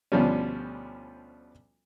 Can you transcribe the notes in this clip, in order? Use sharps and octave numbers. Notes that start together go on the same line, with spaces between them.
D2 B2 F3 G3 C#4